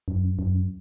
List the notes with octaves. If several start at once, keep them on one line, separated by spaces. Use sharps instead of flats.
F#2
F#2